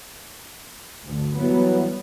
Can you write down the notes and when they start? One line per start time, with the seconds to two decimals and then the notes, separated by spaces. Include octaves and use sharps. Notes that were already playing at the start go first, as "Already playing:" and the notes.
1.04 D2 G2
1.36 E3 F#3 G3 B3